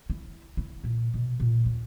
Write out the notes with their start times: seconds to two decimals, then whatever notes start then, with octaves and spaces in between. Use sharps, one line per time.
0.10 E4
0.57 E4
0.84 A#2
1.14 B2
1.40 A#2
1.66 D#2